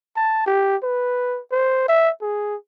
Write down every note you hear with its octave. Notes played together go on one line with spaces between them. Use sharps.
A5
G4
B4
C5
E5
G#4